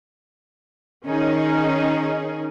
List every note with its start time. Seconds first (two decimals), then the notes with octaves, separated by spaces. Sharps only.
1.07 D#3 C#4 D#4 G#4